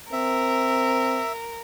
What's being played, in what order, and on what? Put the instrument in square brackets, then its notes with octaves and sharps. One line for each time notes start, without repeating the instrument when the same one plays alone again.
[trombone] C4 [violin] A#4 [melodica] E5